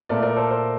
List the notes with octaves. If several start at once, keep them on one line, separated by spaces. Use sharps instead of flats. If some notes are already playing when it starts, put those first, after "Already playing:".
A#2 A3 A#4 D5
A#4 D5
A4 C5
A4 C5